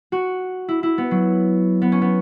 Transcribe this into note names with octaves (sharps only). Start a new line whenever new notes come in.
F#4
E4
E4
B3
F#3
B3
C#4
B3